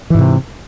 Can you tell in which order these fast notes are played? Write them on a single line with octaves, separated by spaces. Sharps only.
E3 G#2 C3